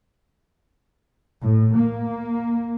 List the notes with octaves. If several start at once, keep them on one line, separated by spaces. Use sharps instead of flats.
A2
A#3